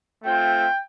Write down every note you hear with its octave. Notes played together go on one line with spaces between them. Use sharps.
A3 C4 F4 G5